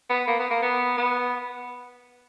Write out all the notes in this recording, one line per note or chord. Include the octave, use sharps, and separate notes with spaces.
B3
A#3
B3
A#3
B3
B3